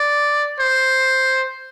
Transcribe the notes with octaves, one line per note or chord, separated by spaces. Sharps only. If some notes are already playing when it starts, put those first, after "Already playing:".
Already playing: D5
C5